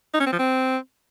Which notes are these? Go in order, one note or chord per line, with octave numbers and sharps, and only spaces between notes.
D#4
C#4
C4
F3
C4